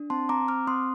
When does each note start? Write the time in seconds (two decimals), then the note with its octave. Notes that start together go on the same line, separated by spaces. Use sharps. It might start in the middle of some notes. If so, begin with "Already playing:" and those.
Already playing: D4
0.10 C4 A5 C6
0.29 C4 A#5 D6
0.48 C4 D6 F6
0.67 C4 C6 D#6